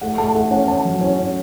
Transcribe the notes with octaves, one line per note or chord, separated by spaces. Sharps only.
A3 F#5
A3 A5
A3 F#5
C#4 F#5
C#4 A5
F#3
C#4
C#4